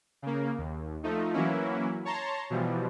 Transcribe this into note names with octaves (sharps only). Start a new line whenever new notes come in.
C#3 A#3
D#2
F3 A3 D#4
E3 F#3 A#3 C#4 E4
C#5 A5 A#5 C6
B2 E3 F3 G3